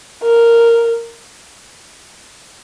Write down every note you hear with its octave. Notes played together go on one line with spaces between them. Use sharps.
A#4